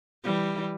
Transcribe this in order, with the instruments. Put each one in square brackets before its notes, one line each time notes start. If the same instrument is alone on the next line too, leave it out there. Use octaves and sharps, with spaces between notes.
[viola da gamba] E3 G3